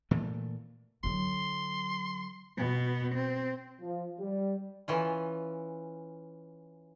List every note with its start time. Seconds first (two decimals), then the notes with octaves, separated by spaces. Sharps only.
0.11 A#2 E3 A3
1.04 D3 F#3 C6
2.58 B2 B3
3.14 C4
3.81 F3
4.18 G3
4.88 E3 C#4 F4